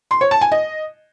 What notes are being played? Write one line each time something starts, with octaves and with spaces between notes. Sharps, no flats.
C6
C#5
A5
G#5
D#5